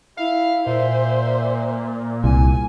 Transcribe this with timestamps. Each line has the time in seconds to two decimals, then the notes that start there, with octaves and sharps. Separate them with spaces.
0.17 E4 F5
0.67 A#2 C5 E5
2.24 C2 G#5